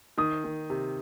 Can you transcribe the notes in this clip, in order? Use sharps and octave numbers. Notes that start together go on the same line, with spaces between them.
D#3 D#6
D#3
C3